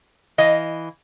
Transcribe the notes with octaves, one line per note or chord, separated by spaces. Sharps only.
E3 D#5 F5